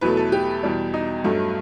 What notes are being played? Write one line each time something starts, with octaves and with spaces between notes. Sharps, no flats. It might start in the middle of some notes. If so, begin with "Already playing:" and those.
E2 B2 F#3 A3 B4
A4
G4
E2 B2 G3
D#4
G2 F#3 A3